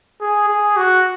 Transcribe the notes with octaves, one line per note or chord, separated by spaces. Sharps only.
G#4
G#4
F#4